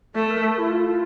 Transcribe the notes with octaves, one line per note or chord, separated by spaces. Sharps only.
A3 A4
A#4
A4
E4
F4